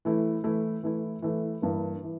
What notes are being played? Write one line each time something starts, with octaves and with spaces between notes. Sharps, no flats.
E3 A3 E4
E3 A3 E4
E3 A3 E4
E3 A3 E4
G2 E3 A#3
E3